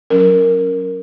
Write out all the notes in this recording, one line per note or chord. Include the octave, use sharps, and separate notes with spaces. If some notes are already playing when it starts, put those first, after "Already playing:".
F#3 C#4 A#4